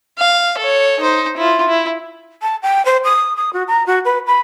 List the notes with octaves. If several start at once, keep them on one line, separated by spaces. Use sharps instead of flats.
F5
A4 C#5
D#4 C5
E4 F4
E4
A5
G5
C5
D#6
D#6
F#4
A#5
F#4
B4
B5